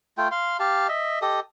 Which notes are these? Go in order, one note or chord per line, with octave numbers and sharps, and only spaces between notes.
A3 F4 G5
F5 C6
G4 F5 A5
D#5 E5
G4 A4 D#5 D#6